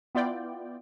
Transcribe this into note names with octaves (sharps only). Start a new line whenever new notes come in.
B3 E4 F4 D5 G5